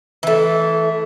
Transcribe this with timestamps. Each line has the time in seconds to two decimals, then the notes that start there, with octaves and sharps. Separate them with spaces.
0.23 E3 A3